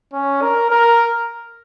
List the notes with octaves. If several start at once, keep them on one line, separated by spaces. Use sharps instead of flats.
C#4
A#4
A#4